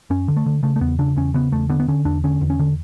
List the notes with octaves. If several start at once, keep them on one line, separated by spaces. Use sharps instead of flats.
F#2 C#4
D3
A3
D3
C#3 A3
A3
E2 B3
C#3 D4
E2 C#4
C#3 B3
E2 A3
D3 B3
B3
D3 C#4
E2 D4
D3 C#4
E2
C#4
D3